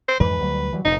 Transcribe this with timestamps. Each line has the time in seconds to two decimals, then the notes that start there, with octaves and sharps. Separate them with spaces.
0.08 C5
0.20 F2 G#2 E3 B4
0.39 D2 F#3 G3
0.73 E3 F#3 G3
0.85 F1 F2 A#2 D#4